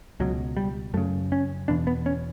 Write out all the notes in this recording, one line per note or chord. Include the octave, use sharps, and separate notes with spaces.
C#2 B2 F#3
G3
F#2 C#3 A3
C#4
E2 B2 D4
B3
C#4